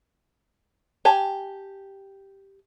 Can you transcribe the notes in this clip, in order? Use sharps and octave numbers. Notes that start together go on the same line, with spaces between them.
G4 G#5 A5